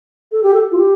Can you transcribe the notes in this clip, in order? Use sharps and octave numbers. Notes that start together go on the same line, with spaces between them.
A4
G4
A4
F4
G4